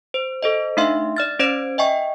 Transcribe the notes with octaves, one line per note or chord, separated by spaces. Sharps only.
C5
A4 C5 D#5
A3 D4 D#4 E5 F5 C6
D5 F6 A6
C#4 C5 D5 G#6 D7
D#5 E5 G5 G#5 C#6